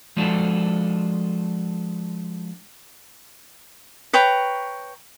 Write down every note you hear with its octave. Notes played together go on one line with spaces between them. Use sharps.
F3 G#3 D4 F4 F#4 A4
B4 C#5 G5 A#5